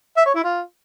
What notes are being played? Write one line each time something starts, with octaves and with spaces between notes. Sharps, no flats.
E5
C#5
E4
F4